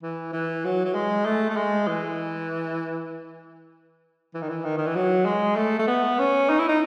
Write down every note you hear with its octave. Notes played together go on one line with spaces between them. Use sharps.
E3
E3
F#3
F#3
G#3
A3
A3
G#3
E3
E3
D#3
E3
D#3
D#3
E3
F#3
G#3
A3
A3
B3
C#4
D#4
E4
D#4